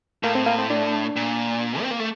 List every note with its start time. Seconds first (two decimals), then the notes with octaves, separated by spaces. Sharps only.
0.23 A2 A#3
0.35 C4
0.46 A#3
0.58 C4
0.70 D4
1.16 A#2
1.82 C4
1.91 A#3
2.00 A3